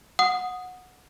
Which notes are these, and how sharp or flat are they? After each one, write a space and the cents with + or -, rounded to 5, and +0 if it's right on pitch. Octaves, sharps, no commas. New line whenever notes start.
F#5 -15 D#6 +0